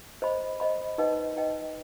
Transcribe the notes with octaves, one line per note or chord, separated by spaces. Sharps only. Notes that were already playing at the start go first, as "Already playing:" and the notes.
C5 D#5 B5
C5 D#5 B5
D#4 B4 D#5 G5
D#4 B4 D#5 G5